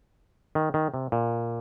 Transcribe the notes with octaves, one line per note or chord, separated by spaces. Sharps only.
D#3
D#3
C3
A#2